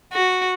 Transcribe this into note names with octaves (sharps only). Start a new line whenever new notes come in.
F#4